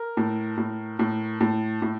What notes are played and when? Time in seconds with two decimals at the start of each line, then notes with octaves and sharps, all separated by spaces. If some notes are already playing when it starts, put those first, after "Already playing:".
Already playing: A#4
0.17 A2
0.58 A2
0.99 A2
1.41 A2
1.82 A2